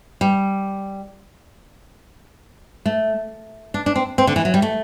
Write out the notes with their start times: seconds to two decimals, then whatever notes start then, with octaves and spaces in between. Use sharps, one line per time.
0.21 G3
2.86 A3
3.74 D4
3.86 D4
3.96 C4
4.18 C4
4.27 D3
4.36 E3
4.45 F#3
4.54 G3
4.62 A3